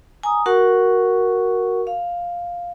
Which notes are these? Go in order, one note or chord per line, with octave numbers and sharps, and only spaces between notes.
G#5 A#5 D#6
F#4 A#4 F#5 C#6
F5